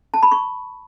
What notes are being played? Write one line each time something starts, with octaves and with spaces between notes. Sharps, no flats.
A5
B5
C#6